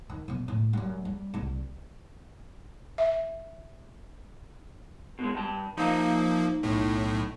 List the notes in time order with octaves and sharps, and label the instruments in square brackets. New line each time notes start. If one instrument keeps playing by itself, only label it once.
[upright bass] D#3
F#2 B2
A2
F#2 G3
G3
C2 G3
[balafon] E5
[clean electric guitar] B2 G#3
G2 A5
[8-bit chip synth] F3 A#3 [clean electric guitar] D#4 E5 A#5
[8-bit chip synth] B1 A2 A3